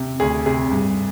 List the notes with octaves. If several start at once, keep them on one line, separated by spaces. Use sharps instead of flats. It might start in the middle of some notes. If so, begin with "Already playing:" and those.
Already playing: C3
D2 G#4
C3 G#4
G2